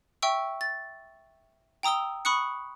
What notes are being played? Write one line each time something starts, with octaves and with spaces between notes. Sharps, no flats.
E5 G5 C#6 E6
A6
G5 A#5 D#6 E6 G7
B5 C#6 D#6 F#6 C#7